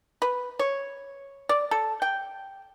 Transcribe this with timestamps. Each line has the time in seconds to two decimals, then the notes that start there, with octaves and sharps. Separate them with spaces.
0.22 B4
0.59 C#5
1.49 D5
1.71 A4
2.02 G5